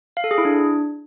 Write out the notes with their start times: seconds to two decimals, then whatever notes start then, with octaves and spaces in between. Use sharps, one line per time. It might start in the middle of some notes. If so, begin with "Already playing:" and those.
0.17 F5
0.24 A4
0.31 G#4
0.38 E4
0.45 D4